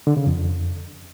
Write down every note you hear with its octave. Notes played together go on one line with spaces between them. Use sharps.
D3
C#3
F2